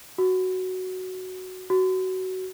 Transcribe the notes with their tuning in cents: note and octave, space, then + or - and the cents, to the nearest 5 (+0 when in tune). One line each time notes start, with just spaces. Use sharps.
F#4 +5
F#4 +15